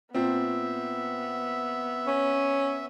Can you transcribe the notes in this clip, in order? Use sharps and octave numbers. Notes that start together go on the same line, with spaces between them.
A#2 B3 C4 E5
C#4